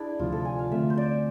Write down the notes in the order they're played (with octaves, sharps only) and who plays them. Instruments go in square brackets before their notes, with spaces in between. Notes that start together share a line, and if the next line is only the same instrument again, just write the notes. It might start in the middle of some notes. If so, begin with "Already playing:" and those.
Already playing: [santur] D4 E4 G#4
[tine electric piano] D2 C3 F3 [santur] F4
[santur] A4
G#5
F5
[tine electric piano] D3 A3 C4 [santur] E5
[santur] C5
D5